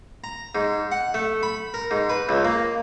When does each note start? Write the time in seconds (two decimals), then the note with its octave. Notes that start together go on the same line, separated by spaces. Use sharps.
0.24 A#5
0.55 G#2
0.91 F#5
1.14 A3
1.43 B5
1.74 A#4
1.91 G#2
2.09 B4
2.29 C#2
2.45 A#3